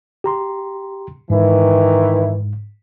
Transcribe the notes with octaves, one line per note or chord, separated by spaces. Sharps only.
G4 A#5 C6
G#2 D#3 E3